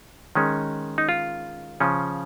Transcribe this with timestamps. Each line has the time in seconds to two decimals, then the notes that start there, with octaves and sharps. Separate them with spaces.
0.35 D#3 G#3 C#4
0.98 D#4
1.09 F4
1.80 C#3 F3 C#4